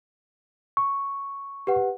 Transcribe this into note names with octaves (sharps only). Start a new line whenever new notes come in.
C#6
G4 B4 F#5